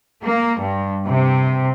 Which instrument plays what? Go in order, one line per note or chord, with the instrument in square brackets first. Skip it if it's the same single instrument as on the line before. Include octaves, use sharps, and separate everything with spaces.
[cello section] A#3
G2
C3